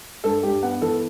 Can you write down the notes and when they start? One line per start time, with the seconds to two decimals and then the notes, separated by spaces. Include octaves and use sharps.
0.24 G2 A4
0.43 G2 G4
0.63 B3 F#5
0.81 E3 A4